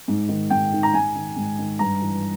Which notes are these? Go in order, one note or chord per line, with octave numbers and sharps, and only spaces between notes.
G#2
D#3
G#2 G5
D#3
A#5
G#2 G#5
D#3
G#2
D#3
G2 A#5
E3